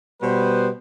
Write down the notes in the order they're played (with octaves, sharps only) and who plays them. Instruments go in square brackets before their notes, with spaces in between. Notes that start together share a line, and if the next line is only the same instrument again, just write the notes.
[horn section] B2 G3 B3 B4 C5